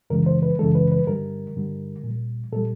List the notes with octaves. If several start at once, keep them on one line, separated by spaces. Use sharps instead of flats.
F#2 C#3 E3 G#3 A#4
C5
B4
F#2 C#3 E3 G#3 A4
B4
B4
G2 D3 G3 A#4
G2 D3 G3
A#2 G3
A#2 G3 A4